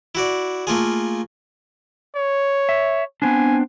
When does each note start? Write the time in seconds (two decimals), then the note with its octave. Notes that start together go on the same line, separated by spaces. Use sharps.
0.15 E4 F#4 D5
0.67 A3 A#3 F4 G#4
2.16 C#5
2.69 E5
3.22 B3 C4 D4 G#5